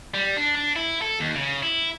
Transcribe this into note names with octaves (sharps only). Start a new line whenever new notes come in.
G3
D4
D4
E4
A4
D#2
C#3
E4